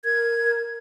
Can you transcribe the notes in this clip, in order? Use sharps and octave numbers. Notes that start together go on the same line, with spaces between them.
A#4 G#6